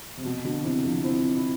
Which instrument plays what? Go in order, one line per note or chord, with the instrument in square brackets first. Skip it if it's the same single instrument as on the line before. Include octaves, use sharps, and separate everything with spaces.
[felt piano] C3
B2
B2 D3
C3 E3
D3 F3
C4 E4
E4